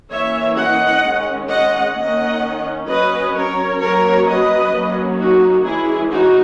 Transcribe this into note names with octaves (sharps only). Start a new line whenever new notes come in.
E3 A#3 C#4 C#5 E5
D#5 F#5
D#3 G#3 C#4
D#5 F#5
D#3 A#3 C#4 D#5 F#5
F#3 C#4 B4 D#5
A#4 C#5
F#3 A#3 C#4 A#4 C#5
B4 D#5
F#3 A#3 C#4
D#4 F#4
E3 G#3 C#4 E4 G#4
D#4 F#4